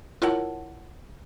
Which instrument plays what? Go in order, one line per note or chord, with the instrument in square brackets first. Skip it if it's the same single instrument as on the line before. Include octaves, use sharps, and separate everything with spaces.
[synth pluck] E4 F4 A#4 C#5 F#5 A5